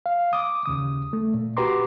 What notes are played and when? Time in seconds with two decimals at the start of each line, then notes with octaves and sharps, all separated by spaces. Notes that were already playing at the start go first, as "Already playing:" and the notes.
0.06 F5
0.33 D6 D#6
0.66 D#2 C#3 D#6
1.13 A3
1.34 A#2
1.57 F#4 G4 B4 A#5 C6 D6